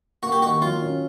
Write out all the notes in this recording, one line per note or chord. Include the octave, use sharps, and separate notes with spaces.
A#3 F#4
G4
D#3 F#4
F#3 F4
C#4